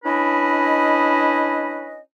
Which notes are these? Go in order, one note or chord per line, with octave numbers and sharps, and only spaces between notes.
C#4 D4 E4 B4 D#5